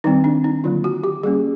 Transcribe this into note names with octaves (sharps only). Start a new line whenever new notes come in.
D#3 G3 C4 D#4
D4
D#4
D3 F#3 A#3 F4
F#4
G4
G3 A#3 C#4 G#4